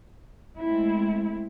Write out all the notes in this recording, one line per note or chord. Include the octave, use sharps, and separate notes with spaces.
G#3 A3 C4 E4